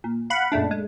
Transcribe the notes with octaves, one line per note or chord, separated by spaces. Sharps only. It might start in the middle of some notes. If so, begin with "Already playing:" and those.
A#2
F5 F#5 B5
F#2 A#2 G#3 A3 D4
G#3